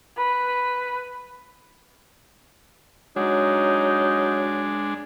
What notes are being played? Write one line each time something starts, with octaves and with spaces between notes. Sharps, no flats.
B4
F#3 G#3 D4 D#4